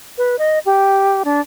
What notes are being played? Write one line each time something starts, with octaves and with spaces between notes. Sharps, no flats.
B4
D#5
G4
D4